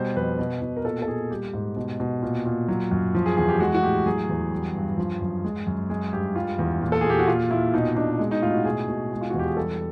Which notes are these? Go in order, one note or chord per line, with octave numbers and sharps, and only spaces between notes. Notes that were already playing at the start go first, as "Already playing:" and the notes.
Already playing: B2 G3 C5
F2 B4
B2
B2
A#4
A#2 A4
A4
A#2 G#4
G3 G4
G#2
B2
B2
A#2
A#2
F#3
F#2
F3
G#4
E2 G#4
G4
G#3 F#4
F#4
A2 G4
F#3 G#4
E2
G3
G2
F3
F#2
G#3
F#2
G#3 G#4
G2 G4
G3 F4
E2
A#2
A4
A#2 G#4
G4
F#4
A#2 F4
A#2 E4
B2 D#4
B2 D4
G#3
D#4
A2 F4
F#4
B2 G#4
B2
G#3
F4
E2 F#4
G4
G#4
G3 A4